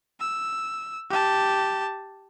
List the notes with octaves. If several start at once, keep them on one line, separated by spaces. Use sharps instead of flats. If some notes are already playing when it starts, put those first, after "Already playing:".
E6
G4 A5